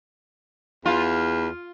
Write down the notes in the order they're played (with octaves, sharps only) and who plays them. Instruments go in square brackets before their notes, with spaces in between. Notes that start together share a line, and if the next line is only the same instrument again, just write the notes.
[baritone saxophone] E2 [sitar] F4